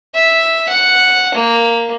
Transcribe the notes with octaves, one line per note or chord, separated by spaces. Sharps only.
E5
F#5
A#3